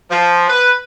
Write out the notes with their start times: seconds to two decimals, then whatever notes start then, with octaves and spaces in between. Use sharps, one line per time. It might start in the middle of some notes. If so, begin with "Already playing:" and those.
0.11 F3
0.48 B4